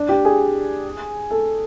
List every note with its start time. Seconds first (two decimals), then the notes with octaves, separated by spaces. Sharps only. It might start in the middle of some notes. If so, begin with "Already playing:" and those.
Already playing: D4
0.09 G4
0.25 G#4
1.31 A4